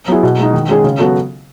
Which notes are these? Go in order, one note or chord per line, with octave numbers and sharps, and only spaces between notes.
F#3 B3 E4 G#4
B2
G#3 D#4
D#3
G#3 C#4 G#4
C#3
F#3 B3 F#4 A4